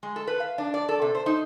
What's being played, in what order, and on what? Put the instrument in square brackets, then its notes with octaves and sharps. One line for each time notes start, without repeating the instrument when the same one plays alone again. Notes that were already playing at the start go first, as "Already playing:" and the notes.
[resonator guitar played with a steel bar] G#3
A4
B4
F5
D4
D5
A4
C3
C5
D#4